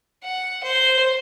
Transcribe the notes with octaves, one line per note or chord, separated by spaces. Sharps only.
F#5
C5